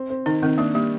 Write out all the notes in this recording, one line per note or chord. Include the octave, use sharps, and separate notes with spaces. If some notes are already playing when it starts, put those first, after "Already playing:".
Already playing: C4
C4
D#3 D#4
D#3 C4
A#3 D4
G3 A#3